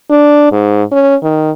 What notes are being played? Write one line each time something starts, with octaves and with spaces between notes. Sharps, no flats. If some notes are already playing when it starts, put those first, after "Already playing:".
D4
G#2
C#4
D#3